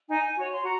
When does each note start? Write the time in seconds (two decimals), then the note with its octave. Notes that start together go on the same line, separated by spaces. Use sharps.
0.09 D#4 G#5
0.36 F#4 C#5
0.52 C6
0.63 F#4 A#5